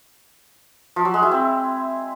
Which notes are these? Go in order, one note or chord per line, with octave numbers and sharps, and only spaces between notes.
F3
F#3
G#3
E4
C4